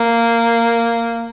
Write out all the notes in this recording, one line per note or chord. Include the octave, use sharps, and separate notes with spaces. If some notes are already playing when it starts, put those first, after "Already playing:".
Already playing: A#3